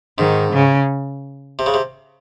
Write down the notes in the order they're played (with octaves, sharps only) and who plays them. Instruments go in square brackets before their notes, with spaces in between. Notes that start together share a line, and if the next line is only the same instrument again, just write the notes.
[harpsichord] G#2 [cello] D#3
[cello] C#3
[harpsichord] C3
C#3
C3